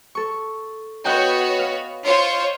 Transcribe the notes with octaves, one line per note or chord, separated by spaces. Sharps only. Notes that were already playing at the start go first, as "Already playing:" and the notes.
A4 C#6
B3 F#4 C#5 D#5 F#5 G5
F5
F4 C5 C#5